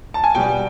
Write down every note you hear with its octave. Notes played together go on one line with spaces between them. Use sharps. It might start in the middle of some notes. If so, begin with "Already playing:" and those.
A5
G#5
B2 G3 B3 G5